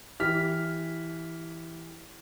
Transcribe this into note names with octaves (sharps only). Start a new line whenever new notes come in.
E3 G4 F6 B6